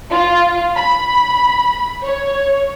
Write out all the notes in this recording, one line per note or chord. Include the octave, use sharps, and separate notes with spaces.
F4
B5
C#5